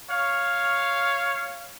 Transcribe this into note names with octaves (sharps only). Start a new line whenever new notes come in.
C#5 F5